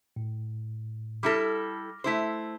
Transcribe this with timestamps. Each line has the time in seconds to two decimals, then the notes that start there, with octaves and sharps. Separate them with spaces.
0.16 A2
1.23 G3 E4 A4 D6 F6 A#6
2.04 A3 E4 C5